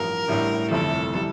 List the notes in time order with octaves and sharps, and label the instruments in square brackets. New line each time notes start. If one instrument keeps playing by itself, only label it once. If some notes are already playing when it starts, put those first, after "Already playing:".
Already playing: [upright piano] A1 G2 F3 [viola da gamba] A#4
[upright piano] A1 A2 G3 D4
[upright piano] G1 F2 C3 E3 A3 [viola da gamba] A4
[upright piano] E3 G3